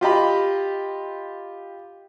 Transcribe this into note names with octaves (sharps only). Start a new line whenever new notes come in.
F4 G4 D#5 B5